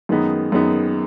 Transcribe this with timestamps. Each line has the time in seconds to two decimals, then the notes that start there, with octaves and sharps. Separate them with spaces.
0.09 F#2 D#3 G#3 B3 D#4
0.52 F#2 D#3 G#3 B3 D#4